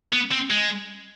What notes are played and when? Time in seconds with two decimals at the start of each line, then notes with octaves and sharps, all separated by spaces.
0.13 B3
0.32 C4
0.50 G#3